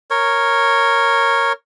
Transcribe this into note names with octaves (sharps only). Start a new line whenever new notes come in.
A#4 C#5